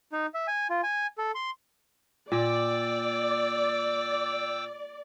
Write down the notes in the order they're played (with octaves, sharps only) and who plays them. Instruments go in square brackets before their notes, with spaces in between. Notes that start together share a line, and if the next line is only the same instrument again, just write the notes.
[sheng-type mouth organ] D#4
E5
G#5
F4
G#5
A4
C6
[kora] A#2 [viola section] D5 [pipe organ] G5 D6 E6